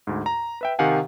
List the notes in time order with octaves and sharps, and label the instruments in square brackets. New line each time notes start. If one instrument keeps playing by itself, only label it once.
[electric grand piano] D2 G#2
A#5
B4 E5 G5
C3 D#3 G4 F5 F#5 G#5